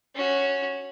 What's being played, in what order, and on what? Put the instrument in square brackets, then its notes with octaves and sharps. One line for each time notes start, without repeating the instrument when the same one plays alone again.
[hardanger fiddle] C#4 F#4